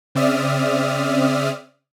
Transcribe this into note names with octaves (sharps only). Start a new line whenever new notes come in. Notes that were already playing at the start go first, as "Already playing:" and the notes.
C#3 C4 D5 E5 D#6 F6